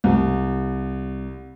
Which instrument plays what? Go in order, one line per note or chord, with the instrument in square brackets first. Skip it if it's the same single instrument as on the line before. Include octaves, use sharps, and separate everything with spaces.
[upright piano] C2